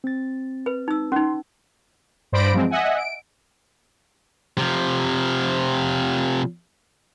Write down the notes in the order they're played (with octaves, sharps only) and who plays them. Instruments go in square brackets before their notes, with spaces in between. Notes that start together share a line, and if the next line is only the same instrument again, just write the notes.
[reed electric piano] C4 A6
[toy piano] B4
D#4 E6
[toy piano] C#4 D#4 [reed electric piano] C6
[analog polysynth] G2 C5 D5 B5 A#6 D7
F3 F#3 G#3 C4
D#5 E5 F#5 G#5
D7
[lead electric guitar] C3 F3